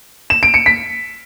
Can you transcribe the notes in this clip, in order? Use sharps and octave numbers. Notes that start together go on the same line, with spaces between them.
E7
D7
C#7
B6